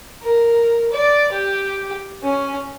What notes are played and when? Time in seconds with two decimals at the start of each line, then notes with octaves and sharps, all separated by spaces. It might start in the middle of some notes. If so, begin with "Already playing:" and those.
0.22 A#4
0.93 D5
1.32 G4
2.23 C#4